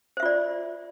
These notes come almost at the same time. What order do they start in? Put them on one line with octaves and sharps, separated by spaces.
C5 E5 F4 D5